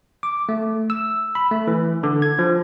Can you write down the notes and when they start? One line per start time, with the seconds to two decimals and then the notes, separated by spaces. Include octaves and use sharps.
0.23 D6
0.49 A3
0.90 E6
1.35 B5
1.51 A3
1.67 E3
2.03 D3
2.22 G#6
2.39 F3